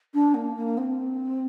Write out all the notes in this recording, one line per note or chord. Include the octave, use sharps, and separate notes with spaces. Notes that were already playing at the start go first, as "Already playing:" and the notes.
D4
A#3
A#3
C4